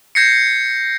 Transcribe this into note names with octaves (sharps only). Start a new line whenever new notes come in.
G6 G#6 A#6 C7 C#7